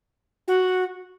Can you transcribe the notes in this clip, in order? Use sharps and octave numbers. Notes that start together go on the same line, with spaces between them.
F#4